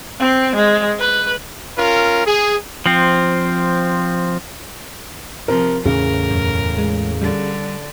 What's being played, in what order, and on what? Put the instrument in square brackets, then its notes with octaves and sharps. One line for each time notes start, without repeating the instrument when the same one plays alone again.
[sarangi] C4
G#3
B4
[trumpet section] C#4 F4 A#4
G#4
[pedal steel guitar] F3 C4
[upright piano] C3 A#4 [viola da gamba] F3
[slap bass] E2 A2 [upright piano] C#3 [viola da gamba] A#4
[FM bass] F#2
G#3
[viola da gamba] D3 [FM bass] G3